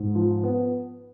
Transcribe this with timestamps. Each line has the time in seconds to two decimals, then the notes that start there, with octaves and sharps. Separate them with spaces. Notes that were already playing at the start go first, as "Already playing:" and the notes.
Already playing: G#2
0.15 F3
0.43 B3